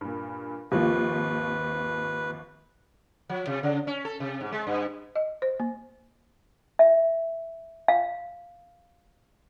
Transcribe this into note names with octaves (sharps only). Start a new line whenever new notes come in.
G2 A#2
G#1 D#2 F3 A#3 F4 G4 B4
F3
C3
C#3
C#4
A4
C3
G#2
G#3
G2
D#5
C5
A#3
E5
F5